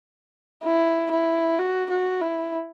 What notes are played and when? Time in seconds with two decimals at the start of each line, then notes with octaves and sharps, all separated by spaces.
0.64 E4
1.11 E4
1.59 F#4
1.90 F#4
2.21 E4